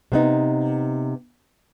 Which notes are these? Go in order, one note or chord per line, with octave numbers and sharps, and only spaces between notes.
C3 B3 D#4